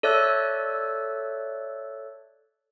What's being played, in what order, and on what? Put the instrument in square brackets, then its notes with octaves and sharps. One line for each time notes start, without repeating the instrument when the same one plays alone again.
[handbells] A4 C#5 D5 E5 E6 F#6